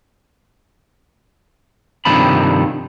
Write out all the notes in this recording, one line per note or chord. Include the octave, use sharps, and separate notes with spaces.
G2 C3 D#3 F3 A4 B5